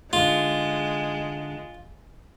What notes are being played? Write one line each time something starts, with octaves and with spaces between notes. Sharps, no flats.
D3 G#3 D#4 F4